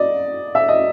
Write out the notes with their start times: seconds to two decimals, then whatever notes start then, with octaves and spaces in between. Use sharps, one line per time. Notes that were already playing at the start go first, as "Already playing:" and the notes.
Already playing: D5 D#5
0.55 E5
0.68 D#5